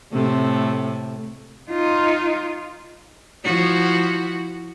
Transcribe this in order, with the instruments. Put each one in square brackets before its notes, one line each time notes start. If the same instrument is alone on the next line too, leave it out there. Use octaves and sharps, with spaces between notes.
[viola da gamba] A2 C3 A3
[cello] D#4 F4
[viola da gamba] F3 E4 F#4